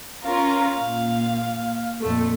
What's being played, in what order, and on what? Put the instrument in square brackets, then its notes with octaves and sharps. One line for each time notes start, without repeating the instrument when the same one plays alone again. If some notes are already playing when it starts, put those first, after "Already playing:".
[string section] C#4 F4 A#4 [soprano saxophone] F5
[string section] A#2
F2 A#2 A3